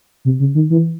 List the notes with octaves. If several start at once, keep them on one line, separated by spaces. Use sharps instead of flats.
C3
C#3
D#3
E3